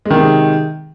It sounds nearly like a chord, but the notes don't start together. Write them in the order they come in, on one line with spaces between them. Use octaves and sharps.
G#3 D#3 C3